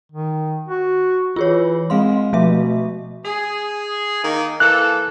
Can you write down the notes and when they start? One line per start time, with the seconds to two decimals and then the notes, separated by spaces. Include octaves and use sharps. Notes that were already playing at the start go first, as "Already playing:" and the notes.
0.12 D#3
0.68 F#4
1.36 E3 F4 G#4 C#5
1.90 G#3 C4 F5 C6
2.33 B2 F3 A3 E5
3.25 G#4
4.23 D#3 A#3 D#4
4.60 E3 A#3 A4 F#6